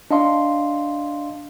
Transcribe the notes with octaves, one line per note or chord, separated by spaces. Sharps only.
D4 D#5 F5 C6